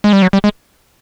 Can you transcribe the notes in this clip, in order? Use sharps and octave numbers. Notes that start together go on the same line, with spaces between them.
G#3
G3
F#3
G3
G#3